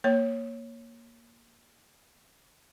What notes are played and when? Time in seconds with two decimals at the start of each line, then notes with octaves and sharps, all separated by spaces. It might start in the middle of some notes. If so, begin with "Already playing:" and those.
0.04 A#3 C#5